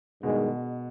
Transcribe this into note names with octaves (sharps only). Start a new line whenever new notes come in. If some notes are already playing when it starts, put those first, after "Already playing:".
G2 B2 D#3 G#3